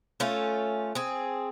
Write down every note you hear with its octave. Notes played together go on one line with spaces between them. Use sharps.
A3 C#4 F4
C4 G#4